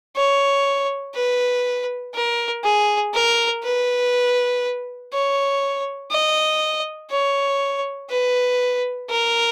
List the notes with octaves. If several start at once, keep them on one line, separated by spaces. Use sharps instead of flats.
C#5
B4
A#4
G#4
A#4
B4
C#5
D#5
C#5
B4
A#4